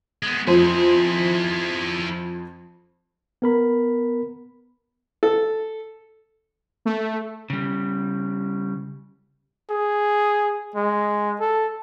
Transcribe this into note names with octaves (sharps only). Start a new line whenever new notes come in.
G#3 B3
F2 E4 G#4 C5
B3 A#4 B5
A4
A3
C#3 G3
G#4
G#3
A4